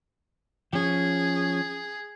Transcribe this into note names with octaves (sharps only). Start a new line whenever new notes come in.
F3 C#4 G#4